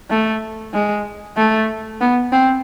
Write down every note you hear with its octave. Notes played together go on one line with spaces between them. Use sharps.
A3
G#3
A3
B3
C4